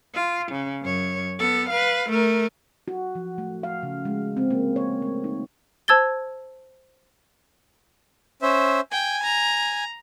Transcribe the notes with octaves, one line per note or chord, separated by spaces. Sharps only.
F4
C#3
F#2 C#5
B3 A4
B4 F5
A3 A#4
F#4
F3
A3
F5
C#3
G#3
C4
A#3
C#5
A3
D#4
C5 A5 E6 G#6 A6 G7
C#4 C5 E5
G5 G#5
A#5